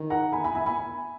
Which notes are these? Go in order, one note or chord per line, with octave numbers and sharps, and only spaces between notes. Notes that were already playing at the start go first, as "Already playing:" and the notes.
Already playing: D#3
F#5 A#5
G#5 B5
G#5 B5
E5 G#5
G#5 B5